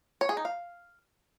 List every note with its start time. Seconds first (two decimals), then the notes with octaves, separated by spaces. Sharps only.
0.21 C#5
0.29 G#4
0.37 D#4
0.45 F5